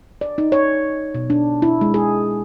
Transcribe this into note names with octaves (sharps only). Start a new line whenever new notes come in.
D5
D#4
C#5
B2
D4
E4
G#3
G#4